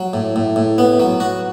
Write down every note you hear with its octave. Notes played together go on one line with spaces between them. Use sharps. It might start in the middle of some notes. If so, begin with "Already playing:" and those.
Already playing: F#3
A2
A2
A2
B3
F#3
F#4